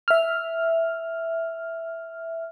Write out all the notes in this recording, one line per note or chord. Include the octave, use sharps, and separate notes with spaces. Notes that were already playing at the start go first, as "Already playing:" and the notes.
E5 F6